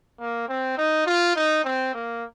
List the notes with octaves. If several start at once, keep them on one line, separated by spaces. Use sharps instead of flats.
A#3
C4
D#4
F4
D#4
C4
A#3